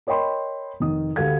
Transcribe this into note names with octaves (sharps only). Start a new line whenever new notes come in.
A#4 C#5 D#5 G5 B5 C6
F1 D#3 D#6
D2 G4 A4 F5 G#6